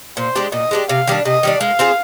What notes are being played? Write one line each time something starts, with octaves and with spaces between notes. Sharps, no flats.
A#2 C5
G#3 D4 G4
A#2 D#5
G#3 D4 G4
C3 F5
D#3 G3 D4
C3 D#5
D#3 G3 D4
G#3 F5
C4 F4 G#4